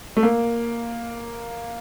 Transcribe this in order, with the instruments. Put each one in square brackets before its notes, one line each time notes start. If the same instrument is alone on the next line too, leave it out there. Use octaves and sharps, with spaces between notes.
[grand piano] A3
A#3